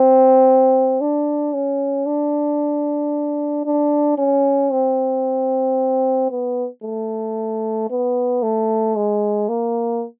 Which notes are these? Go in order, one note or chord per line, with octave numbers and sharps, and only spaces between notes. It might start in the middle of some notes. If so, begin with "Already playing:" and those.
Already playing: C4
D4
C#4
D4
D4
C#4
C4
B3
A3
B3
A3
G#3
A#3